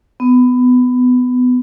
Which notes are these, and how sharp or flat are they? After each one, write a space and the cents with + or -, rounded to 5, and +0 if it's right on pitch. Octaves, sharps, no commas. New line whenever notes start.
B3 +20